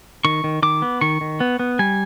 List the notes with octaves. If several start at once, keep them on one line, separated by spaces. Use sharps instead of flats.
D#3 C#6
D#3
D#3 D6
B3
D#3 C#6
D#3
B3
B3
G3 G#5